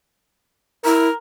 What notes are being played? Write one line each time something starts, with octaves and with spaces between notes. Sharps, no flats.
E4 A#4